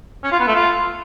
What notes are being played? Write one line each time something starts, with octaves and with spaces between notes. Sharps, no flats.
C#4
F4
B3
A3
F4